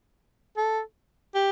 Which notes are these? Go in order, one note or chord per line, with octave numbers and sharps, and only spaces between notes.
A4
G4